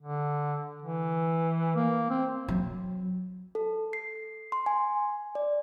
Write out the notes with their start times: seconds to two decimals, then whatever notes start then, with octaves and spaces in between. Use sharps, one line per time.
0.02 D3
0.82 E3
1.76 A#3
2.10 C4
2.48 F#3
3.55 A4
3.93 C7
4.52 C6
4.66 G#5
5.35 D5